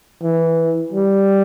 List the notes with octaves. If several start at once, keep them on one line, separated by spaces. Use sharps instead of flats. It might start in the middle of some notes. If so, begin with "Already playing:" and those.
E3
G3